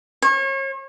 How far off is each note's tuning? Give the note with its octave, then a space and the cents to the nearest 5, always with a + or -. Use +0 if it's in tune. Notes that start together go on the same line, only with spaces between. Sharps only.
C#5 -35